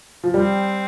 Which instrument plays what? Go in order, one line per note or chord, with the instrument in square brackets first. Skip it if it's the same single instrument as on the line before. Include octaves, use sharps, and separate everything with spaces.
[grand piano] F3
[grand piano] G3 [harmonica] C4